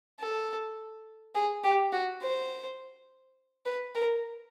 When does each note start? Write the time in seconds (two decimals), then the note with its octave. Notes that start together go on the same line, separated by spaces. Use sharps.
0.20 A4
1.35 G#4
1.64 G4
1.93 F#4
2.22 C5
3.66 B4
3.95 A#4